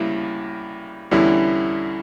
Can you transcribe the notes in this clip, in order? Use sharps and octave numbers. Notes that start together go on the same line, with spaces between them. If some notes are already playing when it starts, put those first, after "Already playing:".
Already playing: D2 C#3 G3 A#3 E4
E2 D3 G3 C#4 E4